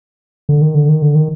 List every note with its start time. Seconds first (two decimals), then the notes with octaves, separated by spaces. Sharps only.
0.49 D3
0.62 D#3
0.75 D3
0.89 D#3
1.02 D3
1.15 D#3